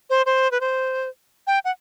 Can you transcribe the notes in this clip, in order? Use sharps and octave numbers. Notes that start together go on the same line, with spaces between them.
C5
C5
B4
C5
G5
F#5